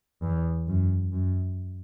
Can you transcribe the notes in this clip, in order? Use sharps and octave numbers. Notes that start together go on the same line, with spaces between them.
E2
F#2
F#2